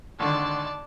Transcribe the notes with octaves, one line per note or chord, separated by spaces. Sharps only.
G#1 D3 D5 A5